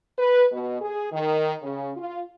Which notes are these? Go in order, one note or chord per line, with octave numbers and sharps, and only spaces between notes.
B4
B2
G#4
D#3
C#3
F4